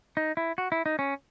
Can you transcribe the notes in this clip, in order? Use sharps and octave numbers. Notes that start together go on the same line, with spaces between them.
D#4
E4
F#4
E4
D#4
C#4